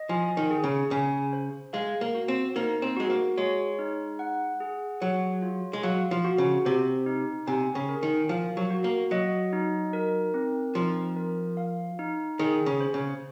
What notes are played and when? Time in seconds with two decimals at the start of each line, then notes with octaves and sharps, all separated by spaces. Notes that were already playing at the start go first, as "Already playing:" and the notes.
Already playing: D#5
0.09 F3 G#5
0.37 D#3
0.51 G#4
0.64 C#3
0.91 C#3 G#5
1.33 C5
1.73 G#3 F5
2.01 A#3
2.15 F#4
2.28 C4
2.56 A#3 D#4
2.82 C4
2.97 G#3 F#4
3.10 A#3
3.38 G#3 C#5
3.79 D#4
4.19 F#5
4.60 G#4
5.01 F#3 C#5
5.42 F4
5.73 G#3
5.83 F#3 F5
6.11 F3
6.24 F#4
6.38 C#3
6.65 C3 C5
7.06 D#4
7.47 C3 G#5
7.75 C#3
7.89 A#4
8.03 D#3
8.29 F3 F5
8.57 F#3
8.70 F#4
8.84 A#3
9.11 F#3 D#5
9.53 D#4
9.93 A#4
10.34 C4
10.75 F3 D#4
11.16 A#4
11.57 F5
11.99 D#4
12.39 D#3 G#4
12.66 C#3
12.80 C5
12.94 C#3